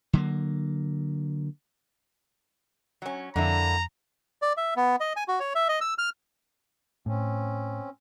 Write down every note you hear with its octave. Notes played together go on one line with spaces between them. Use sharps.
D3 F#3 A#3
F#3 C#4
F2 D3 A#3 E4 A#5
D5
E5
B3
D#5
G#5
F#4
C#5
E5
D#5
E6
F6
A2 C4 C#4